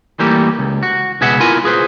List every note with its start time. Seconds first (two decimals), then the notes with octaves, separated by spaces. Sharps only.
0.19 E3 G3 A3 A#3 G4
0.59 C#2
0.83 F#4
1.21 C#2 B2 G#4 B4 E5 F#5
1.40 B3 E4 F4 A#4 G#5
1.64 F4 G#4 B4 C5